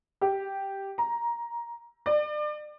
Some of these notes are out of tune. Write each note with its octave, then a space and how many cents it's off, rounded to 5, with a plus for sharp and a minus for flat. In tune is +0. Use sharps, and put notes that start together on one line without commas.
G4 -5
A#5 +15
D5 +35